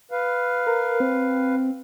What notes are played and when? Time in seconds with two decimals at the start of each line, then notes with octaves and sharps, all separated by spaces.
0.11 B4 F5
0.67 A#4
1.00 C4